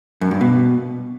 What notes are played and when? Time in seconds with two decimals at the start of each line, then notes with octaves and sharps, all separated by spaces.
0.21 F#2
0.31 G2
0.41 B2